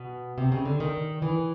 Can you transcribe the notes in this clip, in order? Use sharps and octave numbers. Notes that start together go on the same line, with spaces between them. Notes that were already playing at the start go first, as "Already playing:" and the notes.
Already playing: B2
C3
C#3
D3
D#3
E3